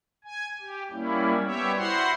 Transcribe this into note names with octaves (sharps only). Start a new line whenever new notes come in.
G#5
G4
G3 A#3 C#4 E4
G3 B3 G4 C#5 E5
E4 F#4 C5 F#5 C6